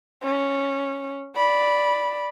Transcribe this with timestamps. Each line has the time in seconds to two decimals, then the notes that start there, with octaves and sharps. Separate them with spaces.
0.24 C#4
1.36 D5 B5